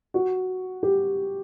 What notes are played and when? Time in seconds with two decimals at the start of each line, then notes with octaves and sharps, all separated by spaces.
0.14 F#4
0.83 G4